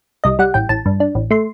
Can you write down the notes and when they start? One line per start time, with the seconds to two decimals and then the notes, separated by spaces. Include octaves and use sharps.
0.24 C2 D#5
0.39 G3 F#5
0.54 A1 G5
0.69 A1 A5
0.86 G2
1.00 D4
1.15 A1
1.31 A3 C6